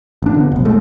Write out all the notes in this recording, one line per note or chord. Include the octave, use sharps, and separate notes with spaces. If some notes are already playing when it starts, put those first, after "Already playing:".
A1 D4
D3 B3
F1 B1
A#2 G#3 A3